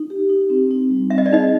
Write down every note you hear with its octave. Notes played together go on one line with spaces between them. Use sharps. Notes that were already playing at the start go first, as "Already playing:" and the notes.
Already playing: D#4
G4
D#4
C4
D#4
G3
C4 E5
D#5
D5
D#4 G#4 D#5